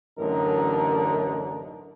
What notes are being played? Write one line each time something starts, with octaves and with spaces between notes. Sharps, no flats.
A1 F#2 D3 D#4 A#4